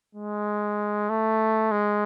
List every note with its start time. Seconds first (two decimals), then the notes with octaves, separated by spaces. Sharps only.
0.15 G#3
1.09 A3
1.72 G#3